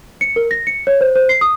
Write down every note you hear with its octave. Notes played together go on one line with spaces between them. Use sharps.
C#7
A#4
A#6
C#7
C#5
C5
C5
C7
D#6